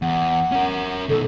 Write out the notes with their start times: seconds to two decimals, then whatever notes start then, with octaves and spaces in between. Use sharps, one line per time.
0.02 E2 F#5
0.52 C#4 A#4
1.09 B2 D#3 A4